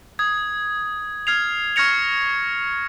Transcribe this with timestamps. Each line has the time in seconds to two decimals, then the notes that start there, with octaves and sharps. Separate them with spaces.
0.19 D#6 G#6
1.27 F6 G#6 C7 F7
1.76 C#6 F6 G#6 A#6 C#7 F7